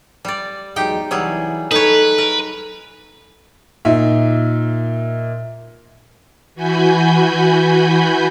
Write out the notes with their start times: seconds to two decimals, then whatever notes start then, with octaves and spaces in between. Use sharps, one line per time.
0.25 G3 D5
0.76 E2 F#3 G#3 D#4 G4 G5
1.11 C2 E3 F#3 G3 G#4
1.71 D#4 A4 B4 C#5
2.18 A#4
3.85 A#2 D#4 E5
6.55 E3 F#4 G#5 B5 G6